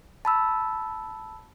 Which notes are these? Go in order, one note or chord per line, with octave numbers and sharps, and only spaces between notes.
A5 B5 E6